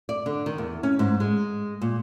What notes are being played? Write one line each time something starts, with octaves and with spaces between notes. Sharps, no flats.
D5
D3
D#3
E2
C#4
G#2
G#3
A#2